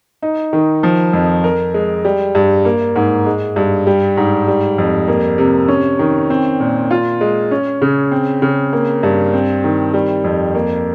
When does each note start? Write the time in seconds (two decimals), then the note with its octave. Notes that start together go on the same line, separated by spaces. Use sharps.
0.22 D#4
0.53 D#3
0.83 F3
1.13 F2
1.44 A#4
1.74 G#3
2.05 G3
2.35 G2
2.65 A#3
2.96 G#2
3.26 G#3
3.56 G2
3.87 G3
4.17 G#2
4.48 G3
4.78 F2
5.08 A#3
5.38 C3
5.68 C#4
5.99 D#3
6.30 C4
6.60 A#2
6.91 F4
7.21 G#3
7.51 C#4
7.82 C#3
8.11 C4
8.42 C#3
8.73 A#3
9.03 G2
9.33 C4
9.64 D#3
9.94 G3
10.24 F2
10.55 A#3